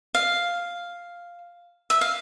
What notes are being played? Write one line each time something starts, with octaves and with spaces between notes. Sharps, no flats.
F5
E5
F5